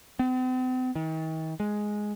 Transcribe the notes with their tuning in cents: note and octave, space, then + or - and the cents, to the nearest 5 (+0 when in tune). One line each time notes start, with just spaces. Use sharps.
C4 -45
D#3 +40
G#3 +5